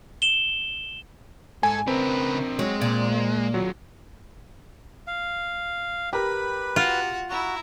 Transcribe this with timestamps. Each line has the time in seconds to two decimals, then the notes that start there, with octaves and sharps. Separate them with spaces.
0.22 E7 G7
1.63 G#2 A4 G#5
1.88 C#3 C4 D4 A#4 B4
2.59 F#3 G#3
2.81 A#2 D5
3.13 A#3
3.54 D#2 F#3 F4
5.07 F5
6.13 G4 A#4 B4 B5
6.76 F4 F#4 F#5
7.29 E4 F#4 A#5